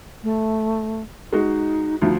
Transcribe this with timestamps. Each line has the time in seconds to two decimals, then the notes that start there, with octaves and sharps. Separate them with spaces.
0.23 A3
1.33 G#3 D#4 F#4
2.02 D2 F3 D#4